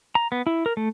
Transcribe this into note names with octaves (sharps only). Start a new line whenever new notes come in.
A#5
B3
E4
A#4
A3